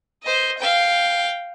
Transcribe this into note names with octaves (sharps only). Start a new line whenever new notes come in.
C5 D#5
F5 G5